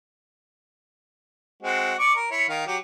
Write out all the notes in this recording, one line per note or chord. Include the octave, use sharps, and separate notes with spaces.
G#3 C4 F#4
D5 C#6 D6
A#4
E4 C#5
D#3 F5
F#3 G4